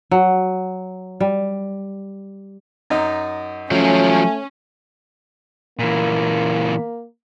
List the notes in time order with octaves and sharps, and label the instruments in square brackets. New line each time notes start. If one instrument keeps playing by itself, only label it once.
[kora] F#3
G3
[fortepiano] F#2 D#4
[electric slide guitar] F3 F#3 [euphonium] A3 [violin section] C#4
[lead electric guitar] A#2 E3 [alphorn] A#3